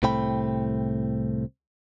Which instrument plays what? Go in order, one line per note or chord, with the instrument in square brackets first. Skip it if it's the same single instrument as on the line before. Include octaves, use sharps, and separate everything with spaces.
[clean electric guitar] C2 A2 A3 C4 G5 B5